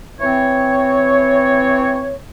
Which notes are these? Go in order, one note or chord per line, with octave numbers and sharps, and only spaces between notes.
E3 C4 C#5